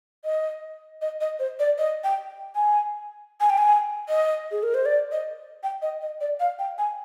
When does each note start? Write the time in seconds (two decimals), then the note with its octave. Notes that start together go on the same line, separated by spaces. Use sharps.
0.25 D#5
1.02 D#5
1.21 D#5
1.39 C5
1.59 D5
1.79 D#5
2.04 G5
2.55 G#5
3.40 G#5
3.50 G5
3.58 G#5
4.09 D#5
4.52 G#4
4.63 A#4
4.74 C5
4.86 D5
5.12 D#5
5.63 G5
5.82 D#5
6.02 D#5
6.21 D5
6.40 F5
6.59 G5
6.78 G#5